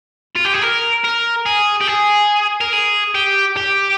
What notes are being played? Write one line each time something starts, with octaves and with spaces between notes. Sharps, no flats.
F4
G4
G#4
A#4
A#4
G#4
G4
G#4
A#4
G#4
G4
G4